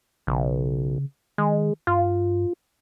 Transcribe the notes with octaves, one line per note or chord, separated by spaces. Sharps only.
B1 C#3
D#3 G#3
G2 F4